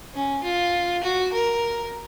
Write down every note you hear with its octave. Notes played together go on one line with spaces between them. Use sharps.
C#4
F4
F#4
A#4